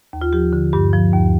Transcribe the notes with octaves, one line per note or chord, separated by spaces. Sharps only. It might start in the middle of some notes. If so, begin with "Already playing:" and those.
D#2
F4
F3 G4
D3
G2 G4
F3
D#2